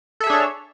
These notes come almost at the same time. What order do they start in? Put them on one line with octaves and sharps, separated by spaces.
A4 E5 G#4 D4 C#5